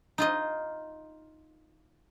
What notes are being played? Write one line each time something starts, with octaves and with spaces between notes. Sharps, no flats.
D#4 F4 D#5